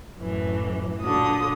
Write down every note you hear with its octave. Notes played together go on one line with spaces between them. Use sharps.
F#2 A2 E3
A#2 D3 F#3 D#6